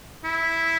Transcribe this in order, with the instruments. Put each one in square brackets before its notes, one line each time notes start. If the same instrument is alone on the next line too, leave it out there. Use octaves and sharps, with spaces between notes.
[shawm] E4